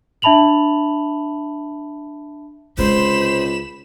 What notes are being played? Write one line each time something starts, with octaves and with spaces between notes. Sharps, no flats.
D4 E5 A5 B5 F7 F#7
C#2 C3 G#3 C5 B5 E7